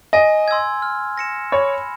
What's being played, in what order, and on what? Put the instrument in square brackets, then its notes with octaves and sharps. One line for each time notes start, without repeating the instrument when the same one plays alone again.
[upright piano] D#5 [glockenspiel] G#5
[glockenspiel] C6 E6 G#6
F6
A#6 C#7 E7
[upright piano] C#5 [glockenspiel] B5